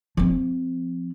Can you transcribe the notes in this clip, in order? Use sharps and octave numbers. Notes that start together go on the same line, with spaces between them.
F3 C4